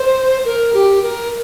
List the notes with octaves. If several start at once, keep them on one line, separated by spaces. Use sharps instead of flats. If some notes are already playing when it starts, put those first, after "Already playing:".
Already playing: C5
A#4
G4
A#4